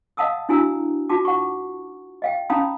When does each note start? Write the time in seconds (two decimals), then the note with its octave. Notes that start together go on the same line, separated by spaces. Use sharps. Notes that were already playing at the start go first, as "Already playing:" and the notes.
0.17 D#5 F5 F#5 A5 D#6 E6
0.49 D4 E4 F#4 G#5 A#5 E6
1.09 D#4 F4 F#4 A5 D6
1.25 F#5 C#6
2.22 D#5 F5 G5
2.50 C#4 D#4 F5 A#5 B5 D#6